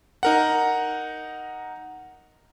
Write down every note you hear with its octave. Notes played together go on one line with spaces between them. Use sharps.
D#4 A#4 F#5